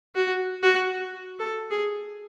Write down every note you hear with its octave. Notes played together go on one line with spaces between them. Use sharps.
F#4
F#4
A4
G#4